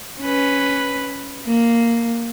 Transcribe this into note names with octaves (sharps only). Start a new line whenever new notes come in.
C#4 B4
A#3